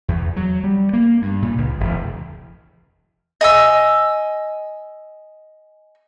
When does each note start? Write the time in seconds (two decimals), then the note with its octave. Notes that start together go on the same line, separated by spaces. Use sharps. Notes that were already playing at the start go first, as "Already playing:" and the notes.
0.08 E2
0.36 F#3
0.64 G3
0.93 A#3
1.22 G2
1.42 A#2
1.58 C#2
1.80 E1
3.41 D#5 G#5 E6